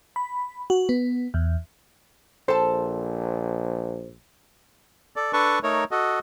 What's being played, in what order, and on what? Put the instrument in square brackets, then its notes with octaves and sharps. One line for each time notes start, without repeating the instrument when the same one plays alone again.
[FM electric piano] B5
F#4
B3
E2
[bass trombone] A#1 [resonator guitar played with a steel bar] A4 A5 [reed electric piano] C5
[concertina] A4 D5
D4 A4 B4 A5 C#6
A3 D#4 A#4 C#5
F#4 A4 D#5